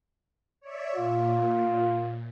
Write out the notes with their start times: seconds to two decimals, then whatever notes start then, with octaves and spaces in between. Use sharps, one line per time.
0.61 C#5 D5 E5
0.96 A#2 F4